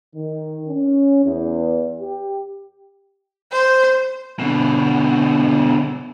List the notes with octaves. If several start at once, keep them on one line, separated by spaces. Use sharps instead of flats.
D#3
C#4
E2
G4
C5
B2 D3